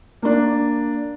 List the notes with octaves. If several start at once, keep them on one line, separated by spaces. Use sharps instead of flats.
A#3 D4